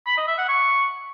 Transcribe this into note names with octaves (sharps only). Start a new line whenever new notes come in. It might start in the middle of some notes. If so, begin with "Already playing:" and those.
B5
D#5
E5
F#5
C#6